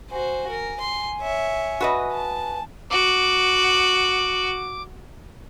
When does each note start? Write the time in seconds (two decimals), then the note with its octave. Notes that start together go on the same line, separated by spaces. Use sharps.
0.11 F#4 C5 G#5
0.50 A#4
0.81 C6
1.22 C#5 E5
1.81 F#4 B4 D#5
2.12 A5
2.91 F#4 D6